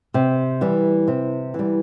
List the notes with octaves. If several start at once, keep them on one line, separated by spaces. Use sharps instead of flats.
C3
E3 G3
C3
E3 G3